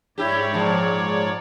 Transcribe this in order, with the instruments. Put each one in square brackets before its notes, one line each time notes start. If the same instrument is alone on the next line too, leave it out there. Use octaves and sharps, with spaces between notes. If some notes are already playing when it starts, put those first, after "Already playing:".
[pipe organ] G#2 C#5 D5 [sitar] E4 G4
[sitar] A#2 F3